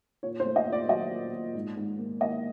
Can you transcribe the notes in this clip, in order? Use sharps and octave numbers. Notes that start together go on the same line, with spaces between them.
A#2 C#5
C5
A3
D#5
A#2
D5
F#3 D#5
A#2
A#2
G#2
G#2
A#3
A#3 D#5